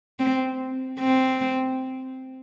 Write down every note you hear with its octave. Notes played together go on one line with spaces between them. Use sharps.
C4
C4